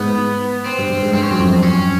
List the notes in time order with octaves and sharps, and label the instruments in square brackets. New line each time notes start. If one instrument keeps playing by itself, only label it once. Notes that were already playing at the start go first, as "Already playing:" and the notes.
Already playing: [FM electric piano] G#2 [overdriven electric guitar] B3
[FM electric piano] G#2
[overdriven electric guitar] C4
[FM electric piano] G2
G2
G#2
[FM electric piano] G2 [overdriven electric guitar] C4
[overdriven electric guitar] C#4
[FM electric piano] F#2 [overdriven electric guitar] C4
[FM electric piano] F2
[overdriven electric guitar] C#4